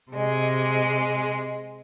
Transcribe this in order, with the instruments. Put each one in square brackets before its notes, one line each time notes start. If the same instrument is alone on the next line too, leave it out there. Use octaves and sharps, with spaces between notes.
[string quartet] C3 G#3